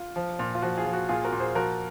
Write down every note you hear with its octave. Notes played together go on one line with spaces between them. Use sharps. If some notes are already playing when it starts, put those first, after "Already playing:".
Already playing: F4
F3
A#2
F4
F3 F#4
F4 G#4
F3
F#4
A#2 F4 G#4
F#4 A#4
A#2
G#4 C5
F3 F#4 A#4